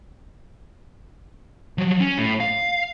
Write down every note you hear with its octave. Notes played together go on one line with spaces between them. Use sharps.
F3 F#3
C#4
A2
F5